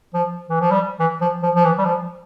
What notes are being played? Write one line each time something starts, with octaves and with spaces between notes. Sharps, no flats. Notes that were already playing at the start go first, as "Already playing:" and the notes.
F3
E3
F3
G3
E3
F3
F3
F3
E3
G3
F3